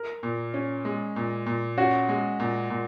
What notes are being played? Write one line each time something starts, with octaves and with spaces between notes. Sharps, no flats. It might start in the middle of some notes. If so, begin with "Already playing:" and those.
Already playing: A#4
A#2
C#4
G#3
A#2
A#2
C#4 F#4
G#3
A#2
A#2